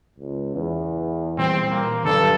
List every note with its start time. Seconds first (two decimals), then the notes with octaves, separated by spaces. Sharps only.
0.18 C#2
0.55 E2
1.38 A#2 E3 G3 C4
1.71 A#3
2.05 G2 D3 F#3 G3 A4